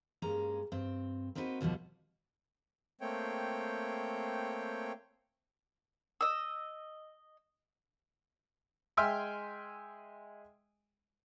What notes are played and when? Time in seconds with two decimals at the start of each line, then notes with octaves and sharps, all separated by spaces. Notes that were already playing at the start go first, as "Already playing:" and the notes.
0.22 G2 G#3 A#3 C#4 A#5
0.72 G2 C4
1.35 A#3 C4 D#4 F#4 A#4 B4
1.61 D#2 B2 F3 G3
3.01 A3 A#3 C4 C#5 G5
6.21 D#5 E6
8.97 G#3 E5 G5 G#5 C6 F6